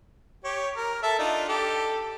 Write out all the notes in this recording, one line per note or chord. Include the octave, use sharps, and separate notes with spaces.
G4 C#5
A#4
A4 E5 A5
D4 D#4 F4
G4 A4